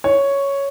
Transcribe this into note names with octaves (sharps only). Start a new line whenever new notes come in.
C#5